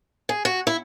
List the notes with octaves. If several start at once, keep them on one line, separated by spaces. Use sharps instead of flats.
G#4
F#4
E4